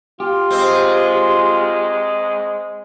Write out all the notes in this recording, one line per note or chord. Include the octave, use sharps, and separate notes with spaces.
F4 G4
G#3 C4